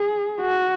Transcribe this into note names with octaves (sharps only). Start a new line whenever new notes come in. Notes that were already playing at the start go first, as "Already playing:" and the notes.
Already playing: G#4
F#4